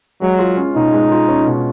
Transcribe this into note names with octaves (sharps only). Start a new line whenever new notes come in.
F#3 G#3
F4
C#4
B2 D#4
G#3
F4
C#4
B2